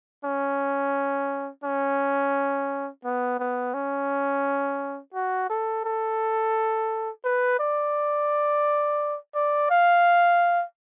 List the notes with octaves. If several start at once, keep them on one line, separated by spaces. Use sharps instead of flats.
C#4
C#4
B3
B3
C#4
F#4
A4
A4
B4
D5
D5
F5